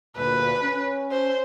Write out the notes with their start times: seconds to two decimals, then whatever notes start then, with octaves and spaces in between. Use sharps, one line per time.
0.17 D2 G2 A#2 B4
0.63 C#4
1.11 C5